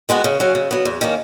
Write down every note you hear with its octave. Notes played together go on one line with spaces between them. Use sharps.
D#3 G#3 B3 F#4
C#3
F#3 C#4
C#3
F#3 B3
E2
D#3 A#3 C#4